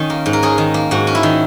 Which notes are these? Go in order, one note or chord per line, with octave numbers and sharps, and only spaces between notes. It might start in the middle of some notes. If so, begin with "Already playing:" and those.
Already playing: D#3 C#4 A#4
A#3
G#2
A#4
C#4 G#4
D#3
A#3
G#2 F#4
C#4
E4
D#3